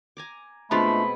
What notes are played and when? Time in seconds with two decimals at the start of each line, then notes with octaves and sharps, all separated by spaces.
0.17 G#5 A#5 D6
0.71 B2 G#3 A3 C4 D4 F4 B5